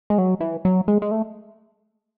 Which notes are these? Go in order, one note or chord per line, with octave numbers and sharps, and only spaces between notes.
G#3
F#3
E3
F#3
G#3
G#3
A3